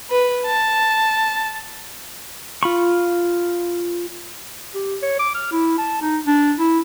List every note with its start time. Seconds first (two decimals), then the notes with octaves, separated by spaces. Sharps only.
0.10 B4
0.46 A5
2.63 F4 B5 C#6
4.74 G4
5.02 C#5
5.19 D6
5.35 F6
5.52 E4
5.78 A5
6.02 D#4
6.26 D4
6.59 E4